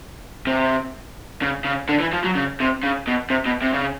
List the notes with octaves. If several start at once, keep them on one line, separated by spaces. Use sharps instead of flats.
C3
C#3
C#3
D3
E3
F3
F#3
C#3
C3
C#3
B2
C3
B2
C3
C#3